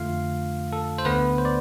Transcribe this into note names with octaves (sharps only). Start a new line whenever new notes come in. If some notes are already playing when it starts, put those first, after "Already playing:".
Already playing: F2 D3 A3 F4 F5
A4
C5
D2 D3 A3 B3 B4
C5
D5